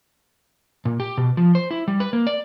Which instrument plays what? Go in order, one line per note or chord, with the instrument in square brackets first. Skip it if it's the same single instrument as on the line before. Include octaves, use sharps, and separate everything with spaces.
[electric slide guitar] A#2
G4
B2
F3
C5
E4
G3
B4
A#3
D5